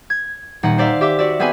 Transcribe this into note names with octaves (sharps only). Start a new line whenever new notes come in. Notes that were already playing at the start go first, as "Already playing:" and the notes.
G#6
D#1 D#4 F#5
C5 D5 E5 F5
G4 E5 D6
F#4 D5 E5
B3 C4 G#4 B4 G#5